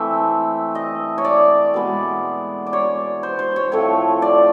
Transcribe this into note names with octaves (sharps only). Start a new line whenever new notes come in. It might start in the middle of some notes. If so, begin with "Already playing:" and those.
Already playing: E3 A3 C4 E5
D#5
C#5
D5
B2 G#3 B3
D5
C#5
C5
C5
C#5
A2 F3 A3 C4 C#5
D5